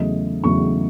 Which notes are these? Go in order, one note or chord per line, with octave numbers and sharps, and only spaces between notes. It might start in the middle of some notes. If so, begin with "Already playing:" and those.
Already playing: E2 C#3 F#3 A3 D#5
E2 C#3 F#3 A3 C#6